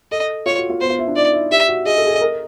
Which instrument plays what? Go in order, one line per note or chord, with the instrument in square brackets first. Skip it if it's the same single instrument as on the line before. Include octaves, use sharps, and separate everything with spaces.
[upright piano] A4 [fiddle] D#5
[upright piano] F4 [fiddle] C#5
[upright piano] F#4
F4
[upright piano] B3 [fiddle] C5
[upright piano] F4
E4
D4
[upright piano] D#4 [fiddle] D5
[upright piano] E4
[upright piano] G4 [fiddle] E5
[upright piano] F#4
[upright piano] G#4 [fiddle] D#5
[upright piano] A4
G#4
A4
A#4